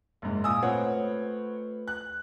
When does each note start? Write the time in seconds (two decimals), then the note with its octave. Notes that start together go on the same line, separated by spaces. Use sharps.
0.22 F#1 G#2
0.44 A#2 G#5 D#6 E6
0.63 A3 C4 F4 B4 C#5 F#5
1.88 F#6